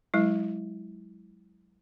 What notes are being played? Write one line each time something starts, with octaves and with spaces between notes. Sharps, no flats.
F#3 G#3 E4